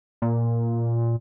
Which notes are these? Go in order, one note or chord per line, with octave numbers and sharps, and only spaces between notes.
A#2